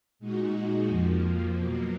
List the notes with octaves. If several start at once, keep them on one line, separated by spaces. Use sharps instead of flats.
A#2 G#3 D#4 F#4
F2 F3 A#3
B2 F#3 A#3